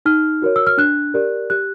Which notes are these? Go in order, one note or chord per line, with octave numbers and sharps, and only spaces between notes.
D#4 F6
F#4 A#4 C#5
E6
F6
D4 F#6
G4 A#4 D5
G4 F#6